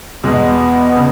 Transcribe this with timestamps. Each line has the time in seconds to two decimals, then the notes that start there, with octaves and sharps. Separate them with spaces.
0.24 E2 B2 G#3 B3
0.96 C#3